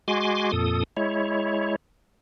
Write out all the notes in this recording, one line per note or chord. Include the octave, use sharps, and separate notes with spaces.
G#3 F#4 G#5 C6 D6
F2 A#2 A4 D#6
G#3 E4 C#5